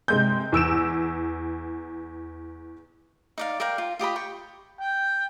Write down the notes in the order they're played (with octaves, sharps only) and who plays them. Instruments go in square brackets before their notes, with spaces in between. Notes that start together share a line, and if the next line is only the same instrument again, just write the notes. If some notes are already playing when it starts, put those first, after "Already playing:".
[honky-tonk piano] C3 G#3 G6
E2 E6 D7 E7
[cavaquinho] D#4 D5 F5
A#4 D5 F5 G5
F4
F4 G4 D#5 B5
G5 C#6
[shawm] G5